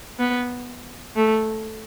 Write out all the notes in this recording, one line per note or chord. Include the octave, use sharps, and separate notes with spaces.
B3
A3